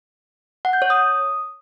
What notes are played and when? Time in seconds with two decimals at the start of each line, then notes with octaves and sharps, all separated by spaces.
0.65 F#5
0.73 G6
0.82 C#5
0.90 D#6